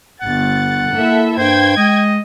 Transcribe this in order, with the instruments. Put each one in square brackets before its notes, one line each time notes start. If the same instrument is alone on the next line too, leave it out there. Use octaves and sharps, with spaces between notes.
[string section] G1 A6 [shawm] F#5
[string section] A#3 A4 E5 [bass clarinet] E4
[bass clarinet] G2 [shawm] C5 [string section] G5 G#6
[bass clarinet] G#3 [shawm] D#5